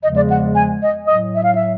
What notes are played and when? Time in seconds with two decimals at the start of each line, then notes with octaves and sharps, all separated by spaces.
0.03 E2 C#3 F3 G#3 D#5
0.17 D5
0.30 F#5
0.55 G#5
0.82 D#5
1.07 A2 F#3 D#5
1.34 E5
1.43 F5
1.54 E5